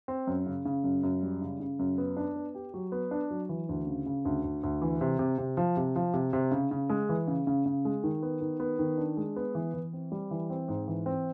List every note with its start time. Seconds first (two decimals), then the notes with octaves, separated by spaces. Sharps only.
0.08 C4
0.27 F#2
0.46 C#3
0.65 C#3
0.84 F#2
1.03 F#2
1.22 G3
1.41 C#3
1.60 C#3
1.79 F#2
1.98 B3
2.17 D4
2.36 B3
2.55 G4
2.74 F#3
2.92 B3
3.11 D4
3.31 F#3
3.49 E3
3.69 D2
3.87 C#3
4.06 C#3
4.25 D2
4.44 D2
4.63 D2
4.82 E3
5.01 C3
5.19 C3
5.38 C3
5.57 F3
5.77 C3
5.96 F3
6.14 C3
6.33 C3
6.51 C#3
6.71 C#3
6.90 G#3
7.09 E3
7.27 C#3
7.47 C#3
7.66 C#3
7.85 G#3
8.04 D#3
8.22 B3
8.41 D#3
8.60 B3
8.79 D#3
8.98 D4
9.17 G#3
9.36 B3
9.55 E3
9.74 E3
9.93 C4
10.12 G3
10.31 E3
10.50 C4
10.68 G#2
10.88 E3
11.06 C4